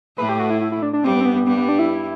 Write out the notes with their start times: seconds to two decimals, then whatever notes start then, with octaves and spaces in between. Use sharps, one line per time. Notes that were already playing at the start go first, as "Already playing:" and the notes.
0.18 A2 A3 B4
0.29 G4
0.39 F#4
0.50 E4
0.61 E4
0.72 E4
0.82 D4
0.93 D4
1.03 G2 G3 C4
1.14 B3
1.20 C4
1.25 B3
1.36 B3
1.46 G2 G3 B3
1.57 B3
1.69 D4
1.79 E4